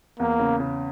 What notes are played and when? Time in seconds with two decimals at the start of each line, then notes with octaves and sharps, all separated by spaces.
0.19 E2 A#3
0.39 C#3
0.60 C#3